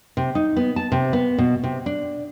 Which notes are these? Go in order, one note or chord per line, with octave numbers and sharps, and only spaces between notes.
C3
D#4
B3
A5
C3
B3
B2
C3
D4